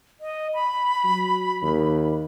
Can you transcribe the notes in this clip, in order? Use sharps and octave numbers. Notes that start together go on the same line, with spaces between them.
D#5
B5
F#3
D#2